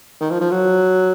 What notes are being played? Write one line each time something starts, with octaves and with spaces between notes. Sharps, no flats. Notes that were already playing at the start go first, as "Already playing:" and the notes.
D#3
F3
F3
F#3